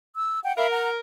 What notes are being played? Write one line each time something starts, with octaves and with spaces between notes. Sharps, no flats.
E6
F#5 G5
A#4 E5 F5 B5
F#5 A#5